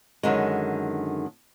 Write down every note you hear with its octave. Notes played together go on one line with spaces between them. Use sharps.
F#2 D3 D#3 G#3